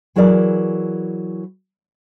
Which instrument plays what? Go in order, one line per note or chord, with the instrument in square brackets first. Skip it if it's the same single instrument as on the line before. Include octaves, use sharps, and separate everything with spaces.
[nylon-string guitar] E3 F#3 E4 G#4 A#4 D5